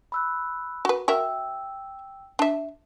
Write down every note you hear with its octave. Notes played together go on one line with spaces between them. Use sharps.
B5 E6 F#6
F#4 B4
F#4 A#4 E5 G5 E6
D4 E5